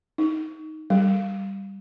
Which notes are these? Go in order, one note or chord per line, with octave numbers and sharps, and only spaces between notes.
D#4
G3